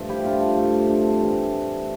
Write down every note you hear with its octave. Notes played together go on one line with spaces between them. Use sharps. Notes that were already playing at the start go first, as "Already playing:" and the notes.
Already playing: G2 F3 A3
E4 G4
D4 F4
G2 F3 A3
D4
C4
A2 E3 G3
D4